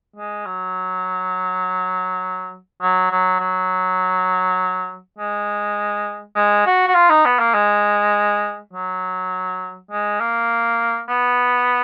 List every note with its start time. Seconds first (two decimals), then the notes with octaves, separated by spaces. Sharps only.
0.16 G#3
0.45 F#3
2.82 F#3
3.11 F#3
3.40 F#3
5.18 G#3
6.35 G#3
6.66 F#4
6.88 F#4
6.94 F4
7.10 D#4
7.25 B3
7.39 A#3
7.54 G#3
8.73 F#3
9.91 G#3
10.20 A#3
11.08 B3